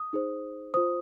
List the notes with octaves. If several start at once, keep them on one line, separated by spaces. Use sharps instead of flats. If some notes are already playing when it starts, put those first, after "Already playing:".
Already playing: D#6
D#4 G#4 C5
F4 C5 D#6